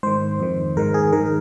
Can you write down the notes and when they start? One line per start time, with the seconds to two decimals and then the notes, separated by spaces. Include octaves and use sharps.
0.03 G#2 D#3 C5
0.40 F2 D#3
0.77 G#2 D#3 A#4
0.94 G#4
1.12 G#2 D#3 A#4